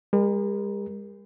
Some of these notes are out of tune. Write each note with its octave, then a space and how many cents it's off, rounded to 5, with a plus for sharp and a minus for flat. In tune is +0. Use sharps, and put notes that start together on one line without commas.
G#3 -45 A#4 +15